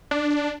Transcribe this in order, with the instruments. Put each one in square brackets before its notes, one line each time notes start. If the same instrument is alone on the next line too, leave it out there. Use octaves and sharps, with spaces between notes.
[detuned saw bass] D4